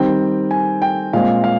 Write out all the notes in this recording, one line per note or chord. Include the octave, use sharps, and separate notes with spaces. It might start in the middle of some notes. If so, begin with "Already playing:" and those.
Already playing: D#3 G3 C4 G5
G#5
G5
A#2 G#3 C4 F5
F5